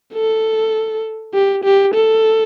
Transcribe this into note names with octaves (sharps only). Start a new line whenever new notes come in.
A4
G4
G4
A4